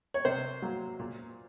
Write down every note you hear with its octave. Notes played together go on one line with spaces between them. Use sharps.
C#5
C3 C5
F#3 A#3
A#2